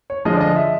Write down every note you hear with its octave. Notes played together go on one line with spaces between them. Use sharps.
C#5
D3 F3 G#3 D#5
D5
D#5
E5